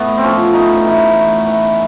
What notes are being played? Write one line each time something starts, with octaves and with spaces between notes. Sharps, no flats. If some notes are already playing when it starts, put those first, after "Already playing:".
Already playing: A2 B3
C4
F3 C#4
A2 D#4
E3
A2
E3